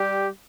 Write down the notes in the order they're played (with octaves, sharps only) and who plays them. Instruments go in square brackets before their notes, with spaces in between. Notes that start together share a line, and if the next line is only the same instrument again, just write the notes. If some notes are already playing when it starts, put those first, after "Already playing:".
Already playing: [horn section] G3 G4